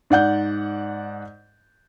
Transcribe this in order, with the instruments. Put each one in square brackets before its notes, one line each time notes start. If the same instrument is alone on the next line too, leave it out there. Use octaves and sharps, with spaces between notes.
[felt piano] G#2 D5 F#5 G6